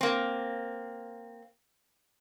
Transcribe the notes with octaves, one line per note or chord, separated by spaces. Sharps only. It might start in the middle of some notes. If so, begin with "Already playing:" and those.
A#3 C4